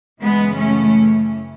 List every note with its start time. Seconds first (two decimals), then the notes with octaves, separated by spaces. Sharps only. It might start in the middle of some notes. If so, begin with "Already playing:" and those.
0.21 F#2 C#3 E3 G#3 B3
0.58 A3 C#4